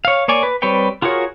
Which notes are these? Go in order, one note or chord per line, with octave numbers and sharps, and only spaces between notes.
C#5 F5
A#3 C#5 D5 G#5
B4
G3 C4 B4 C#5 G5
F4 F#4 G#4 A#4 C#5